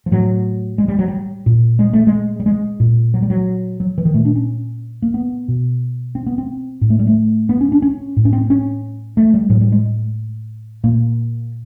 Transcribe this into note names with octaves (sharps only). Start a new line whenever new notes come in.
F3
A2 F#3
G#3
G3
F#3
G3
A#2
G#3
A3
G#3
G3
G#3
A#2
F#3
G3
F#3
F#3
E3
D#3
A#2 A3
D4
C#4
A#3
B3
B2
C4
B3
C4
A2
A3
G3
A3
B3
C#4
D4
C#4
A2
C#4
C4
C#4
A3
G3
A2 F#3
G3
G#3
A#2 A#3